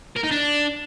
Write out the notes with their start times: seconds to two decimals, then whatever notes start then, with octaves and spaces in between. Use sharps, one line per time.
0.16 A#4
0.24 D#4
0.31 D4